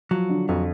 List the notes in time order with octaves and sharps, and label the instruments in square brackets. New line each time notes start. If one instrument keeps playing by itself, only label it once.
[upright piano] F3 [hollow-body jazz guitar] F#3
[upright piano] D3
[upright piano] F2 [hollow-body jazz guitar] F#3